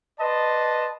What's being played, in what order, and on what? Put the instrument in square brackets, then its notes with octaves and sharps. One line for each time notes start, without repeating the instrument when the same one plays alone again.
[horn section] B4 D5 D#5 A5 C6